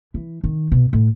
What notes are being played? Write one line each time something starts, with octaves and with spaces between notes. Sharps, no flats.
E3
D#3
B2
A2